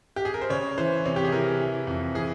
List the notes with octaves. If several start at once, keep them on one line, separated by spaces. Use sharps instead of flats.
G4
G#4
A#4
C5
C#3 C#5
E3 C5
C3 C#5
G4
G#4
E3 A#4
E3
F2
E3 G#4